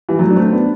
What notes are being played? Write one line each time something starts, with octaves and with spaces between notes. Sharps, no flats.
E3 G3
F#3 A3
D4
A3 C4
B3 D4